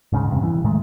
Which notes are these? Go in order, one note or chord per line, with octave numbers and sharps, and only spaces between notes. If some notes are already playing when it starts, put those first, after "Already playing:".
D#1 G#2 C#3
E2 G2 C3
E3
A2 D#3 G#3 A3